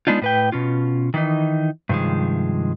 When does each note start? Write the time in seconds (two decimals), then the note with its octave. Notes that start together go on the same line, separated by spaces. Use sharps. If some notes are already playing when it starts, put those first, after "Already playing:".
0.07 G#3 B3 D4 D#4 F4
0.22 A2 B4 G5
0.52 B2 C#4 F4
1.14 D#3 E3 D#4
1.89 G2 C3 D#3 F3 G#3